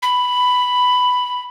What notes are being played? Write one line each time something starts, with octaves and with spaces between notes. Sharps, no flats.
B5